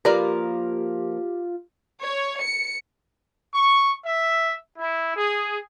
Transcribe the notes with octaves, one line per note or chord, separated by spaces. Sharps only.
F3 A#3 F4 G4 A#4 B4 D5 A#5
C#5
C#7
C#6
E5
E4
G#4